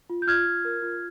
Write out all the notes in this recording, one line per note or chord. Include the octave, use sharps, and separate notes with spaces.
F4
G6
F4 F6 G#6
F4
A#4
F4